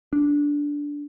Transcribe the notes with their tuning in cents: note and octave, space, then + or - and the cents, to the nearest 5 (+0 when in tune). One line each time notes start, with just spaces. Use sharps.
D4 -10